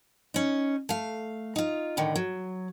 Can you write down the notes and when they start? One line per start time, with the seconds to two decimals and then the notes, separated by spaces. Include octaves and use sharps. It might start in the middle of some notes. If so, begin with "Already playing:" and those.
0.34 C#4 D#4
0.89 A3 F5
1.56 D#4 F4
1.97 A2 D3 D#3
2.16 F#3